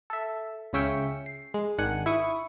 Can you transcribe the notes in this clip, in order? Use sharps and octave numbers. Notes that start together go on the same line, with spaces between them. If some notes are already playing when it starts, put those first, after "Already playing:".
A4 E5
C#2 C#3 C#4 E5 G5 C#7
C7
G#3
G#1 D#3 D4 F#5 G#5
E4 C#6 D#6